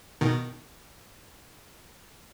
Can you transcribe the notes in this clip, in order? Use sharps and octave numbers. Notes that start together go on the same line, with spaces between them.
B2 D#3